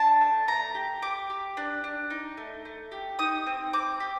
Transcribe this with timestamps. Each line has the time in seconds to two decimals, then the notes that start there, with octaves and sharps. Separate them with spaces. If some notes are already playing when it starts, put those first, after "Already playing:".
Already playing: D4 A5
0.21 A3
0.47 A3 A#5
0.75 G4
1.02 G4 D6
1.30 G4
1.57 D4
1.84 D4
2.10 D#4
2.37 A3
2.65 A3
2.92 G4
3.19 D#4 D#6
3.46 C4
3.73 C4 D6
4.00 G4